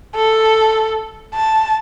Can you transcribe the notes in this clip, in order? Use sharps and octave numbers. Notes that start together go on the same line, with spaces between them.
A4
A5